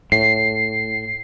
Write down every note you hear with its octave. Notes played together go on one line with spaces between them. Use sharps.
A2 C7